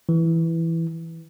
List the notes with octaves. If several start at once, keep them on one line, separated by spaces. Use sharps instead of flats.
E3